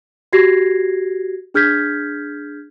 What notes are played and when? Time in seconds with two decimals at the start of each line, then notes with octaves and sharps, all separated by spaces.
0.33 F#4 G4 G#6 A#6 C7
1.54 D4 G#4 F6 G6 G#6 B6